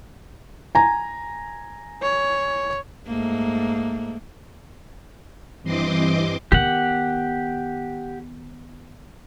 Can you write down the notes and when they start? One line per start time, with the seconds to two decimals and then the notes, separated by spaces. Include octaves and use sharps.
0.75 G#5 A#5
2.02 C#5
3.07 G#2 A3 A#3
5.63 G2 E3 C4 D#5 C6 D6
6.52 D#3 B3 G4 F#5